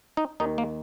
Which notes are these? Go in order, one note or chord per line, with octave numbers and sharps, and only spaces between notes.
D#4
D#2 D#3 D#4
A#3